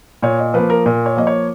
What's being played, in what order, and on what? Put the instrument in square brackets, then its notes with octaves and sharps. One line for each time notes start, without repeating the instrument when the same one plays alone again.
[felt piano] A#2 C#5
D#5
F3 A#3 B4
A#4
A#2 A#4
C#5
F3 A#3 D#5
C#5